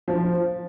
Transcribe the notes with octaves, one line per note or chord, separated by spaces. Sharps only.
F3